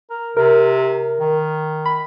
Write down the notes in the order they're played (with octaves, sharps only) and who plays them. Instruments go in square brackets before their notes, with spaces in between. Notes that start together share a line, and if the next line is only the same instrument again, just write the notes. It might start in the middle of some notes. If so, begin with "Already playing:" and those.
[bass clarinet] A#4
[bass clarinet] C3 [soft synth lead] A#4
[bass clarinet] D#3
[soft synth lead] B5